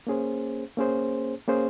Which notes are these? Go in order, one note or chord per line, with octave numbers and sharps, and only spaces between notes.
A#3 C#4 G#4 C5
A#3 C#4 G#4 C5
A#3 C#4 G#4 C5